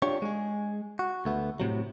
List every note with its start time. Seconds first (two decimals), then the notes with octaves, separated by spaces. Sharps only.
0.02 D4 F4 G4 C#5
0.22 G#3 G#4
0.99 F#4
1.25 D2 A3 B3
1.60 A2 C3 F#3